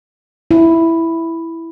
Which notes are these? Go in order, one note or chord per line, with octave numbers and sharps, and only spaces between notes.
E4